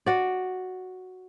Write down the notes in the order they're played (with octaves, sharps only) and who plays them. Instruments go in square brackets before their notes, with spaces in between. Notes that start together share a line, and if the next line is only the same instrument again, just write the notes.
[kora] F#4 D5